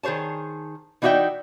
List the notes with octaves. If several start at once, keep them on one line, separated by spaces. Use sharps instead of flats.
D#3 G#4 C5 C#5 A5
E3 D#4 F#4 D5 E5 G5